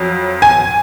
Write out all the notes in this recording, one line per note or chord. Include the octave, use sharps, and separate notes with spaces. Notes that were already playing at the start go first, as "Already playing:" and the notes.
Already playing: F2 F#3
G#5